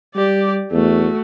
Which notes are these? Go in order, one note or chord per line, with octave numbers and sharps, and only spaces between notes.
G3 G4 D5
E2 A3 F#4